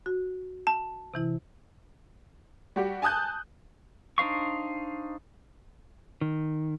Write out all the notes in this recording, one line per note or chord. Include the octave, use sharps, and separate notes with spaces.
F#4
A5
C3 E3 E4
G3 F#4 G4
G#5 A5 D#6 F#6 G6
D4 D#4 C5 F5 C#6
D#3